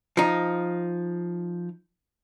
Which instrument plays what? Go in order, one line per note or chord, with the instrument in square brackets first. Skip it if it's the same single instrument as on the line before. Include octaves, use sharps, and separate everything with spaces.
[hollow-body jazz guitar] F3 D#4